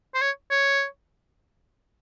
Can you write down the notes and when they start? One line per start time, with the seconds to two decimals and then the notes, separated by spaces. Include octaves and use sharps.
0.14 C5
0.21 C#5
0.50 C#5